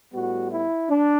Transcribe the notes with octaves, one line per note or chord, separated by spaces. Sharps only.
A2 G3 B3 F#4
E4
D4